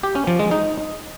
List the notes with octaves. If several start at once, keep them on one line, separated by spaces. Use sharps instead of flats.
G4
C#4
F3
G#3
D#4